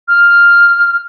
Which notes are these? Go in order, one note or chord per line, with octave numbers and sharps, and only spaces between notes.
F6